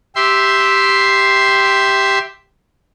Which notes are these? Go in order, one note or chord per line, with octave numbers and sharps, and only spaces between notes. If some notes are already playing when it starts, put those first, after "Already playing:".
G4 E5 C6